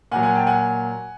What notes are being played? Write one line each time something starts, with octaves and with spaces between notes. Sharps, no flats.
A#2 F#3 F#5 G#5
F#5 G#5
G5 A5
F#5 G#5